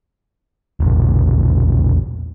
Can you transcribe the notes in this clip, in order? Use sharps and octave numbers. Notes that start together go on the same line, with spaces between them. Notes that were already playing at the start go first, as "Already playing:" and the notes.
E1 A#1